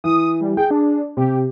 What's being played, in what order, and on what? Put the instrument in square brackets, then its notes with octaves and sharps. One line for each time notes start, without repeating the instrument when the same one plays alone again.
[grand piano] E3 [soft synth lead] D#6
[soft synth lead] G3
[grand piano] G#4 [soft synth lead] G5
[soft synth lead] D4
[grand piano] C3 [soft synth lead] G4